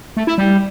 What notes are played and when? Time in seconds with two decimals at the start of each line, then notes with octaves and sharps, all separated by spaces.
0.17 A3
0.27 E4
0.38 G3